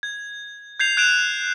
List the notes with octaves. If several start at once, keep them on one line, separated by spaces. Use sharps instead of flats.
G#6
G6 G#6 C7 F7
F#6 G#6 D7 E7 F7